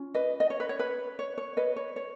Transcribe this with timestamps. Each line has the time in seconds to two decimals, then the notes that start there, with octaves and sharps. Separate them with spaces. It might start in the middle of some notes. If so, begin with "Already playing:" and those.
Already playing: C#4 F4
0.14 B4 D#5
0.40 D#5
0.50 C#5
0.60 B4
0.69 C#5
0.79 B4
1.19 C#5
1.38 C#5
1.57 B4 D#5
1.76 C#5
1.96 C#5